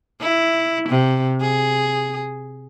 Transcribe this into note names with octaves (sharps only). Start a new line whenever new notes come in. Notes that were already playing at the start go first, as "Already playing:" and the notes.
E4
C3
G#4